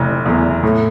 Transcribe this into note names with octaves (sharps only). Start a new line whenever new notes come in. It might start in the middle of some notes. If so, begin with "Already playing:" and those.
Already playing: F1 E3
E2 E3
A2